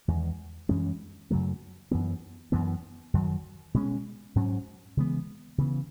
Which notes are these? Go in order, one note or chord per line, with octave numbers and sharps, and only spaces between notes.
E2 D#3 G#3
F#2 E3 G#3 C#4
F#2 C#3 F#3 A3
F#2 E3 B3
F#2 E3 B3
F#2 D#3 F#3
B2 G#3 C#4
G#2 F#3 C#4
C#3 E3 G#3 B3
C#3 E3 B3